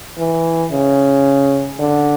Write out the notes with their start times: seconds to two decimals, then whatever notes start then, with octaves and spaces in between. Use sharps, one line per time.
0.18 E3
0.71 C#3
1.79 D3